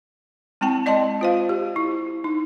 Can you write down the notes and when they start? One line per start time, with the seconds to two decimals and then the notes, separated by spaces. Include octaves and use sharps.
0.61 G#3 C4 E4 G5 A5
0.86 D5 D#5 G5 A5 C6
1.21 F4 C5 F5
1.49 G4
1.76 E4
2.24 D#4